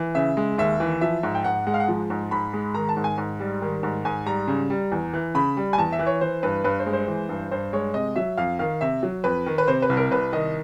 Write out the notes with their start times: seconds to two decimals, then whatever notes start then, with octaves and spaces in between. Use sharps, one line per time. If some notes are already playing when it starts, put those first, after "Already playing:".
Already playing: E3
0.15 C#3 E5
0.37 G#3
0.58 D#2 E5
0.80 E3
1.01 F3 E5
1.23 G#2
1.35 G5
1.44 G#2 F#5
1.67 G#3 F#5
1.74 F5
1.80 F#5
1.88 F3
2.10 G#2
2.31 G#2 B5
2.53 G#3
2.74 D#3 A#5
2.89 A5
2.96 G#2
3.04 G#5
3.18 G#2
3.40 G3
3.62 D#3
3.83 G#2
4.05 G#2 G#5
4.26 G3 A#5
4.48 C#3
4.70 G3
4.92 E2
5.13 E3
5.35 C#3 B5
5.57 G3
5.73 G#5
5.78 E2 A5
5.92 E5
5.99 E3
6.06 C#5
6.21 E3 C5
6.43 G2 B4
6.64 G2 B4
6.79 C5
6.86 G#3
6.93 C5
7.08 E3
7.29 G2
7.51 G2 C5
7.73 G#3 C#5
7.94 C3 D#5
8.16 F#3 E5
8.38 F2 F5
8.59 D#3 F5
8.81 C3 E5
9.03 F#3
9.24 F2 B4
9.46 D#3
9.58 B4
9.68 C3 C5
9.82 B4
9.90 C2
9.97 A#4
10.11 C2 B4
10.33 D#3 D#5